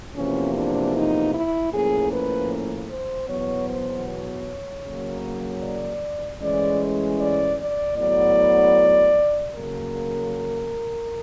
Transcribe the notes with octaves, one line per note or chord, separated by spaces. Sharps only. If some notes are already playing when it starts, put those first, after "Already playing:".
E2 C3 F3 A#3 C#4
D4
D#4
E4
A2 F3 A#3 C#4 G#4
B4
C5
E2 B2 F#3 B3 C#5
C5
C#5
C#3 F#3 A#3
D5
A2 E3 G#3 C#4 D5
D5
D5
A2 F#3 B3 D5
C#3 F#3 A#3 A#4